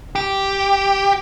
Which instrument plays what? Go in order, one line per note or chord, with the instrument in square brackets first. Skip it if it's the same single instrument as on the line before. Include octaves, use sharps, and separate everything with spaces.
[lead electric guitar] G4